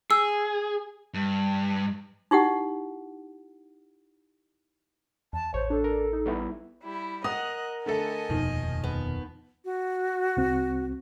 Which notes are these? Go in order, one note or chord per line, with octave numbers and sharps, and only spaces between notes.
G#4 E6
G2
D#4 E4 G4 F#5
E2 A5
A1 C5 C#5
D4 A4
A#4
D#4
G3 B3 E4
G3 E4
A#4 D#5 F#5 D#6 F#6
D3 A3 A4 D#5 G#5
F1 D#2 B2 D#3 F3
B3
F#4
C2 C4